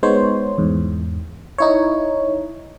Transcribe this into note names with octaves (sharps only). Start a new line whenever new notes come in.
G#3 B3 D#4 C5 C#5
E2 G#2
D#4 E4 C#5